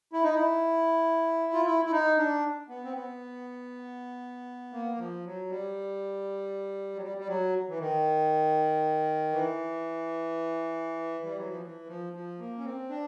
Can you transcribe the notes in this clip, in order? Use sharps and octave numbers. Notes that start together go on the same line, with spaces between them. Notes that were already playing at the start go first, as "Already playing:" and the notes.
E4
D#4
E4
F4
E4
E4
D#4
D4
B3
C4
B3
A#3
F3
F#3
G3
F#3
G3
G3
F#3
E3
D#3
E3
G3
F#3
F3
E3
F3
F3
A#3
C#4
C4
D4